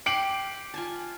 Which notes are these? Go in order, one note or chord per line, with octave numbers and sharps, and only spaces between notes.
G4 C7 D7 F#7
F4 G#5 A5